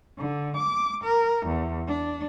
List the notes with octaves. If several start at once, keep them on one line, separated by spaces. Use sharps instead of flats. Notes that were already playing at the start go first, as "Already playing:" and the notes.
D3
D6
A#4
E2
D4